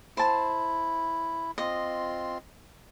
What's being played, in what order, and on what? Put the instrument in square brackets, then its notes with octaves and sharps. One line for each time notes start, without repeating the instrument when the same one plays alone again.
[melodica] E4 [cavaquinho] C5 A5
[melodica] C4 F4 [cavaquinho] D#5